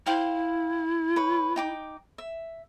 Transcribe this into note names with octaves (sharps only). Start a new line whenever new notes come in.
E4 C5 F5 G5
B4 C#5
D#4 G5 D6
E5